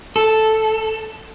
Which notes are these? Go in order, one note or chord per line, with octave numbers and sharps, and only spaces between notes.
A4